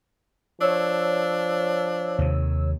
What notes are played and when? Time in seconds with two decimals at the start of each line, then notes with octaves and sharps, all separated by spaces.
0.61 F3 D4 C#5 E6
2.19 D#2 C3 D#3